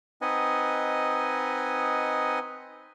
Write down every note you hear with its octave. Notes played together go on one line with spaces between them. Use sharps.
C4 D#4 B4 D#5 F#5 G#5